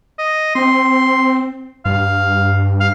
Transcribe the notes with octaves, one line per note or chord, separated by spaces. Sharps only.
D#5
C4 C6
G2 F5
F5